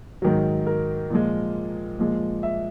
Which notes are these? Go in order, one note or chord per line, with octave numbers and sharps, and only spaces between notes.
G#2 D#3 F#3
A#4
A#2 F3 G#3
A#2 F3 G#3
E5